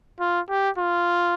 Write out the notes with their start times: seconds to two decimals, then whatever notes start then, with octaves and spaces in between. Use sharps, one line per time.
0.20 F4
0.50 G4
0.78 F4